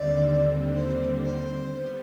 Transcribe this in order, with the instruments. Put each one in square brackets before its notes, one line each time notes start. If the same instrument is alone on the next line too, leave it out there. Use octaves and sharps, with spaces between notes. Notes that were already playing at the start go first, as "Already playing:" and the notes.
Already playing: [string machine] D#2 D3 G3 C4 [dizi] D5
[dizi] C5
C5
[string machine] G3 B3